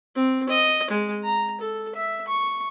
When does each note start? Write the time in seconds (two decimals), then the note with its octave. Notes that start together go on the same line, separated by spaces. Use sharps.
0.15 C4
0.49 D#5
0.90 G#3
1.23 A#5
1.60 A4
1.95 E5
2.27 C#6